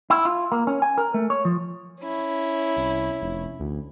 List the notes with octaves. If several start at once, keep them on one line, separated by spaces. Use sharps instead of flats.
E4
F4
A#3
C#4
G#5
A#4
A3
C#5
F3
C#4 E4
C2
F1
D2